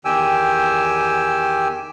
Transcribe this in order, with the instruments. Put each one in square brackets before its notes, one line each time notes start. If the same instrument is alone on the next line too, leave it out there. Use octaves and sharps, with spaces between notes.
[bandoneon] E2 D#3 G4 G5 G#5 E6